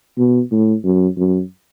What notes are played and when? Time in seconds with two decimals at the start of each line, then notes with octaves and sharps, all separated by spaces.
0.18 B2
0.51 A2
0.84 F#2
1.17 F#2